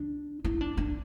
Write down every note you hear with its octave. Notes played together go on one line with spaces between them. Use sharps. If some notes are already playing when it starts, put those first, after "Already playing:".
Already playing: D4
E4
D4
D4